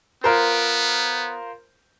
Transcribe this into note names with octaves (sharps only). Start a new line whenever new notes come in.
B3 F4 A#4 C5